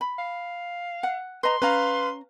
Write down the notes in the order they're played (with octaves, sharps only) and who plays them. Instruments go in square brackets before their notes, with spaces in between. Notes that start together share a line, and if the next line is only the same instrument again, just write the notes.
[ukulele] B5
[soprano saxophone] F5
[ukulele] F#5
[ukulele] B4 D#5 A#5 [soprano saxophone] C6
[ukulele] C#4 A#5 [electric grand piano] B4 F5